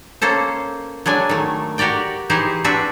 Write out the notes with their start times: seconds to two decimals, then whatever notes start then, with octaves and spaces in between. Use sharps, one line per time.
0.22 A#3 C#4 A4 C5
1.06 F#3 G#3 D4 G#5
1.29 D#3 A3
1.78 F#4 G4 A#4 D5 G5
2.30 E3 D#4 G4 G#4 C5
2.64 C4 D4 F#4 B4 E5